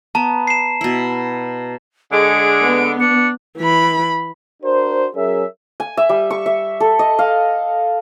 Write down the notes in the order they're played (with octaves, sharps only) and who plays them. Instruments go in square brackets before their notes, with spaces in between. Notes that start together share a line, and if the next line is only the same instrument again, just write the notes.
[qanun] B3 [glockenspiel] A5 A#5
[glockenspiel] C7 E7
[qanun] B2 E4
[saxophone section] D3 G#3 [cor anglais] G#4 [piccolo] D7
[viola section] B3
[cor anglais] D4 [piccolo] C#7
[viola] E3 B5
[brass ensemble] D4 F#4 A#4 C5
F#3 C#4 G#4 A#4 C#5 E5
[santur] G#5
E5
G3
C#6
E5
A4
D#5
F5